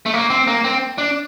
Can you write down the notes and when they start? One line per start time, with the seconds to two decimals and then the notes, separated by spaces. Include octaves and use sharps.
0.06 A3
0.14 A#3
0.30 C4
0.47 A#3
0.64 C4
0.98 D4